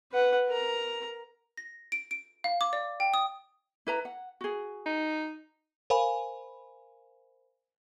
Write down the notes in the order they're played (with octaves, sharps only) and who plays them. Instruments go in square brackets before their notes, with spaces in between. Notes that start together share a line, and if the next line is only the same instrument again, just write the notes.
[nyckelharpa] B4 F#5
A#4 A#5
[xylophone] A#6
D7
D7
F5
D6
D5
G5
D#6
[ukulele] E4 B4 A#5
F#5
F#4 G#4
[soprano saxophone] D#4
[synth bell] A#4 C5 F5 G#5 B5